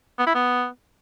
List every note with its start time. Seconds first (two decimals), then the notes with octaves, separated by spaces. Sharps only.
0.19 B3
0.27 E4
0.35 B3